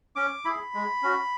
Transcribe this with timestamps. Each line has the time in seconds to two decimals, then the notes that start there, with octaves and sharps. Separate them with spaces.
0.16 C#4 D6
0.45 E4 G#4 B5
0.74 G#3
1.03 C#4 F#4